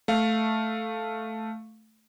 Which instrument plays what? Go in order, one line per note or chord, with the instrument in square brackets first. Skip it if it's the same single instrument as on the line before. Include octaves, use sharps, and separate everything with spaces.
[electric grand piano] A3 F5